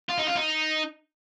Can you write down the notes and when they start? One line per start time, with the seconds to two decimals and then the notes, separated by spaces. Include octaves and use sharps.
0.10 F4
0.19 D#4
0.28 F4
0.36 D#4